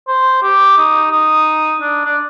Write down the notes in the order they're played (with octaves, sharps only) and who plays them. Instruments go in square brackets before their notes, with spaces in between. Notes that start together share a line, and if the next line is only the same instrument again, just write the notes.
[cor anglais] C5
G4
D#4
D#4
D4
D4